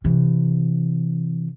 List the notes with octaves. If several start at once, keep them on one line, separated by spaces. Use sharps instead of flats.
C3 E3